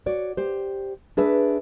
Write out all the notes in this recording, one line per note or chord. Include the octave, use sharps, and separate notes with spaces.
F#4 C#5 D5
G4 C5
D4 G#4 B4 E5